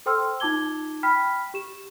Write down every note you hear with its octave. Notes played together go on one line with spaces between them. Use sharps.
A4 C5 G5 C6 E6 F6
D#4 F4 A5 D6 G#6 G7
G5 B5 F6 B6
G4 E7